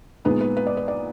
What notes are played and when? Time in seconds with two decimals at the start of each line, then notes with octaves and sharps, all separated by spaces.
0.25 A#2 G#3 B3 D#4 B4
0.41 B4
0.57 B4
0.67 D5
0.77 B4
0.88 D5